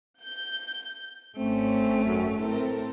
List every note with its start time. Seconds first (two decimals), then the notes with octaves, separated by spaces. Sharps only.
0.21 G6
1.37 G#1 A3 C4 C#4
2.05 F#2
2.38 A2 C4 A4 A#4